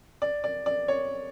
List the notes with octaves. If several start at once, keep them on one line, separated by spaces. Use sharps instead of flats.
D5
D5
D5
C#5